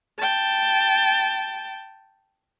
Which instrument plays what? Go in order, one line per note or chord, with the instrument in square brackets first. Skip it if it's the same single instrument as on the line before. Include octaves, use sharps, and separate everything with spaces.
[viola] G5 A5